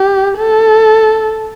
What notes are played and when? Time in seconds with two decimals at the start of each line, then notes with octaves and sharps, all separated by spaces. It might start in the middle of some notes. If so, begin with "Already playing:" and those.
Already playing: G4
0.38 A4